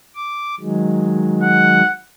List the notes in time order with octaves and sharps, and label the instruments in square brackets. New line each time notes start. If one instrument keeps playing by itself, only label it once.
[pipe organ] D6
D#3 F#3 G#3
[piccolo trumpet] F#5